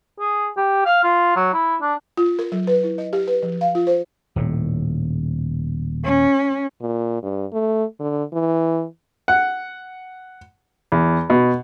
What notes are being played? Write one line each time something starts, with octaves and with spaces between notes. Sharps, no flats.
G#4
G4
F5
F4
F#3
E4
D4
F4
A#4
F#3
B4
E4
D#5
G4
B4
F3
F5
F4
C5
D#1 A2
C#4
A#2
G2
A3
D3
E3
F#5
E2
B2